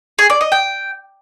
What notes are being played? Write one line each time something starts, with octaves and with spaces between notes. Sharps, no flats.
G#4
D5
D#5
G5